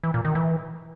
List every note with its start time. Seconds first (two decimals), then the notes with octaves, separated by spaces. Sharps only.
0.04 E3
0.14 A#2
0.25 D#3
0.35 E3